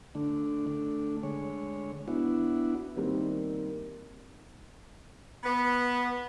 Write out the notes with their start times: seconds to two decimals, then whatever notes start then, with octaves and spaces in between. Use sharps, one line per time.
0.15 D3 A3 D4
0.67 A3 D4
1.23 D3 G#3 C#5
2.08 B3 D4 E4 F#4
2.96 D#3 G3 A#3 C4 D#4
5.44 B3